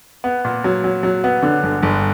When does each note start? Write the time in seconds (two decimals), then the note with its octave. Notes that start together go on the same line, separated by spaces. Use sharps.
0.24 B3
0.45 A#2
0.64 F#3
0.84 F#3
1.03 F#3
1.24 B3
1.42 D3
1.63 G1
1.83 G1